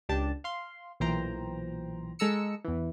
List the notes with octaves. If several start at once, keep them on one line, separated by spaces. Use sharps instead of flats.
C#2 D4 G4 A5
F5 C6
B1 A#2 E3 C5 G5 A#5
G#3 A4 A#5 E6 C#7
E2 E3